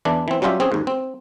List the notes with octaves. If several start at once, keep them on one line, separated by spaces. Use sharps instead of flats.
E2 E3 D4
E3 C4
F#3 G3 C#4 F4 G4 E5
C4 C#4 G#4
D#2 G#2
C4